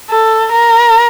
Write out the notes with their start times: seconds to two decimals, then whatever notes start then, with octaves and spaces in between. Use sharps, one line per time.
0.10 A4
0.52 A#4